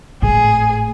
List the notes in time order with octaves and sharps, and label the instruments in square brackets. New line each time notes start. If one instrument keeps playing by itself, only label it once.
[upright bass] G#1 A2 [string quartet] G#4